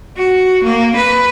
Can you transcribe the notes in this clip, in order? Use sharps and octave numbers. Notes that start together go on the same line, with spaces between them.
F#4
A#3
B4